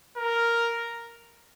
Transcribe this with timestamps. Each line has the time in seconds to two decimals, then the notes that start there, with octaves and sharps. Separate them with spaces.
0.17 A#4